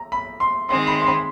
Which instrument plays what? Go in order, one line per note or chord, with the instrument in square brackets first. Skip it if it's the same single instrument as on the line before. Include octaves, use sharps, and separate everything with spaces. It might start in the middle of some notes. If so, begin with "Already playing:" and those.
Already playing: [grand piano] A#5
B5
C6
[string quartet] D#3 G#3 C4 [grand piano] C6
[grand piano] B5
C6
B5